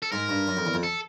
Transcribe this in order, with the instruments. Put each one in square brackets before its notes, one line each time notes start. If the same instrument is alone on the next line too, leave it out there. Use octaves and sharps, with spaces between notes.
[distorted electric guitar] A4
[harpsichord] G#2 [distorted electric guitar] A#4
[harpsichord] G2
F#2
F2
E2
F2
[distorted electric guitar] A4